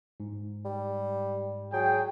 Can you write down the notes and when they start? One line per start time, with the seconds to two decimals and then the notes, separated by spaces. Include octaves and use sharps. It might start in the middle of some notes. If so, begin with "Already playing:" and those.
0.20 G#2
0.65 G3
1.73 F#3 G#4 G5